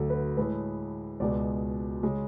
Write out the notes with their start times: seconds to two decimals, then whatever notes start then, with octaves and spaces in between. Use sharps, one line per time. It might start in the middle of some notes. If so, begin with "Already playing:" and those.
Already playing: D2 D3 F#3 A3 A4
0.10 B4
0.37 A2 G#3 B4
1.20 C#2 B2 G#3 D5
2.03 C#3 G#3